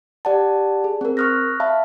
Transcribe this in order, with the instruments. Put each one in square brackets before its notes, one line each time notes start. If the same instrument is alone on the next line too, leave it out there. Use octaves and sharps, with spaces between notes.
[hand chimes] G4 D5 F#5 A5
G#4
C4 A#4
C#6 D#6 F6 F#6 A#6
E5 F5 A5 B5